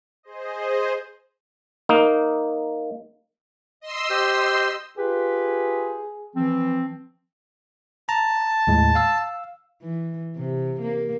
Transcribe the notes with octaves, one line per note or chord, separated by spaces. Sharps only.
G#4 C5 D#5
A#3 D#4
D#5 C6 E6
G4 C5
F4 G4 G#4 B4
E3 F3 C4
A5 A#5
D#2 A2 G#3
F5 E6
E3
C3
A#3